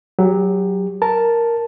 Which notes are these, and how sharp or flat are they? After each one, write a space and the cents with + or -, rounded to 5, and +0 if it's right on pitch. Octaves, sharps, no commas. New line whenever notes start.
F#3 +10 G4 +30
A#4 +0 A5 +0